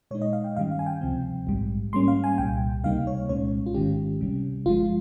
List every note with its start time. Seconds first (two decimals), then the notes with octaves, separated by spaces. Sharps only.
0.11 A#2 G#3 D#4 C#5
0.22 D#5
0.33 F5
0.44 G5
0.57 G2 D#3 G3 C#4 F5
0.72 F5
0.79 G#5
0.86 G5
1.01 C#2 C3 F3 C4
1.47 A#1 G#2 G3
1.93 G#2 G3 A#3 C#4 C6
2.08 F5
2.24 G#5
2.38 C2 A#2 G3 G5
2.84 C#2 C3 G3 A#3 D#4 F5
3.07 C#5
3.29 C2 A#2 G#3 C#4 C#5
3.66 F4
3.74 G#1 G#2 D#3 G#3 C#4 G4
4.20 C#2 C3 G3 C#4
4.66 G1 G2 F3 G#3 F4